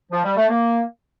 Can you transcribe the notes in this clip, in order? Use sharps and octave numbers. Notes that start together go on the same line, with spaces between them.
F3
G3
A3
A#3